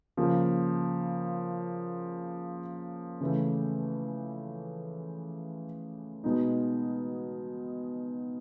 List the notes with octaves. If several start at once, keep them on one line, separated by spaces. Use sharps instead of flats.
C#3 F3 A#3
C#3 E3 A3
B2 G#3 B3 D#4